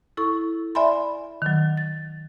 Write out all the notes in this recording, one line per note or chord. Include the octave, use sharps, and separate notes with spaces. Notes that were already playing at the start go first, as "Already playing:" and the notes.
E4 A4 C#6
D5 E5 G#5 B5 C6
D#3 F#3
A6